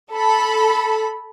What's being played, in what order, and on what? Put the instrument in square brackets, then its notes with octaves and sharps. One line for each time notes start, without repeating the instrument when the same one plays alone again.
[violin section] A4 B5